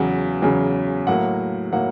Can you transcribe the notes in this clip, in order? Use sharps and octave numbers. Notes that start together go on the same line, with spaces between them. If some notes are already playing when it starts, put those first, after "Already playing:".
Already playing: E2 C#3 F#3 F#5
E2 C#3 F#3
A2 F#3 A#3 F#5
A2 F#3 A#3 F#5